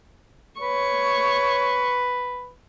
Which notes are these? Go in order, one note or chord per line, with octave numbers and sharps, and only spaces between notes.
B4 C#5 C#6